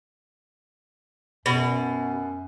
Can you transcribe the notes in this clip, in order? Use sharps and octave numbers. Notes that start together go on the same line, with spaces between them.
F#2 B2